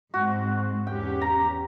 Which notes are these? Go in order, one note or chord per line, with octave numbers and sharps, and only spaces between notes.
G#2 G#3 C4 F#4
E2 C#4 G4 G5
A#5